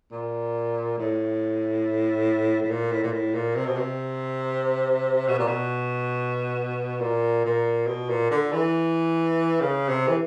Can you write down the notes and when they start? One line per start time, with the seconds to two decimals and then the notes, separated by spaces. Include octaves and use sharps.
0.11 A#2
0.98 A2
2.62 A2
2.70 A#2
2.92 A2
3.03 A#2
3.13 A2
3.34 A#2
3.55 C3
3.66 B2
3.76 C3
5.28 B2
5.39 A#2
5.47 B2
7.01 A#2
7.44 A#2
7.87 B2
8.09 A#2
8.31 D3
8.52 E3
9.60 C#3
9.89 C3
10.07 E3